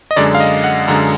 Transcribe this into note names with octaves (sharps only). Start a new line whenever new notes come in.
D#5
F#2 D3 G#3 D5
F5
D#5
F#5
F#2 D3 G#3 A#5